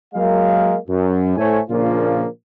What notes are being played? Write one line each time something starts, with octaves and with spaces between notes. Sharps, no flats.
F#3 G#3 A#3 A#4 F5
F#2
A2 A3 C5 C#5 G#5
A#2 C#3 F3 A#3 D4 F4